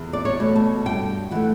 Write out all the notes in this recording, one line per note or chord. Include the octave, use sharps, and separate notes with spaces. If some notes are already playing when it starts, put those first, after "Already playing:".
Already playing: E2
D5
C#5
B2 A3
A5
G2 G5
E3 A3 F#5